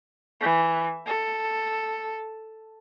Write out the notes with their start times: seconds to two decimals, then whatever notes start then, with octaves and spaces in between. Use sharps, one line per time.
0.40 E3
1.06 A4